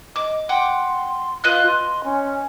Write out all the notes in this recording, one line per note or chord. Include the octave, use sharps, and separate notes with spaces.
D#5 D6
F#5 G5 C6 D6
F4 B4 D#5 F#6
C6
C#4